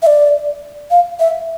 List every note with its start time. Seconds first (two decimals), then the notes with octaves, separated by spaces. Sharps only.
0.02 E5
0.07 D5
0.91 F5
1.20 E5